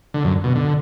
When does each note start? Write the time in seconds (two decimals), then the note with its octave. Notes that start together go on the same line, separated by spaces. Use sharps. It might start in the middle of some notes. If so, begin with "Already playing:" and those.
0.14 D3
0.24 F#2
0.44 B2
0.55 D3